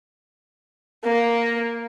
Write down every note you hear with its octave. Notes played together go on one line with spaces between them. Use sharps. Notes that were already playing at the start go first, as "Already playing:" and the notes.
A#3